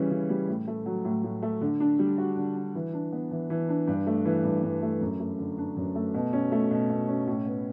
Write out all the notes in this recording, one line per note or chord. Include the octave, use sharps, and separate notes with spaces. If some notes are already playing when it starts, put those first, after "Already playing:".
Already playing: C#3 E3 G3 C#4
C#3
G3
A2
A3
F#3
A2
A2
A3
D3
D4
G3
F#4
D3
D4
E3
D4
B3
E3
E3
D4
G2
A3
E3
G2
G2
A3
F#2
A3
D3
D4
F#2
A3
B2
C#4
A3
B2
B2
C#4
A2
B3